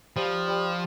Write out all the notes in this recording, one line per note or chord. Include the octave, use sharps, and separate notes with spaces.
F3 G3 G4
G3 G4